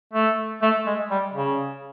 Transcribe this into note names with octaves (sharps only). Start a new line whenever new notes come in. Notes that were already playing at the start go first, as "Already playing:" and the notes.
A3
A3
G#3
G3
C#3